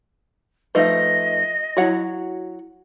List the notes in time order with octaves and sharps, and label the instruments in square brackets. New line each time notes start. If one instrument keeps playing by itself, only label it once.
[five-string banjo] F3 A3 D#4 [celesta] B4 E5 [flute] D#5
[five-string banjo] F#3 C#5 F#5 [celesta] E4 F#4